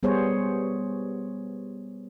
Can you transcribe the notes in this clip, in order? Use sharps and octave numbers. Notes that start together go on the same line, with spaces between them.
G3 B3 G#4 C5 C#5